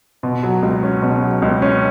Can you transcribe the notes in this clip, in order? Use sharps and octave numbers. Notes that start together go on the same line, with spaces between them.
B2
F#3
C#2
C#4
B2
F#3
C#2
C#4